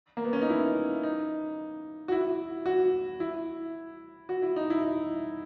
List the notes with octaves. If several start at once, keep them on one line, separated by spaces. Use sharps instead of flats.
A#3
B3
C#4
D#4
E4
D#4
F#4
E4
F#4
E4
F#4
E4
D#4
E4